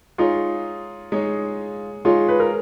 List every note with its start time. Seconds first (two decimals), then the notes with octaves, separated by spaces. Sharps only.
0.18 G#3 D#4 F4 G#4 C#5
1.12 G#3 D#4 G#4 C#5
2.05 G#3 D#4 F4 G#4 C#5
2.28 B4
2.40 A#4